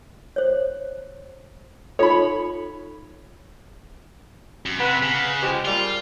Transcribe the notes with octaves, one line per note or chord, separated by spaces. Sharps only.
C5 C#5
D#4 F4 A4 C#5 B5
F#2
C3 B4 F#5
C#3
F3 G#3 G4
A#2 G3 F4